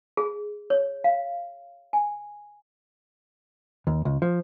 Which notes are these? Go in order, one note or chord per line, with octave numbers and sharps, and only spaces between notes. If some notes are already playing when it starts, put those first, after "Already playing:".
G#4
C#5
F5
G#5
D#2
C#2
F3